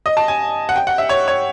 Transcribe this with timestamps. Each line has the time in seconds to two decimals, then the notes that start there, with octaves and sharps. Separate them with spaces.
0.06 D#5
0.17 A5
0.28 G#5
0.69 F#5
0.76 G5
0.87 F#5
0.98 E5
1.09 C#5
1.28 C#5